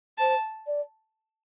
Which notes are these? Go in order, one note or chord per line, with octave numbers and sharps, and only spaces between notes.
C5 A5
D5